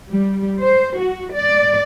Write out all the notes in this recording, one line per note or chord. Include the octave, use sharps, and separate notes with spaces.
G3
C5
F#4
D5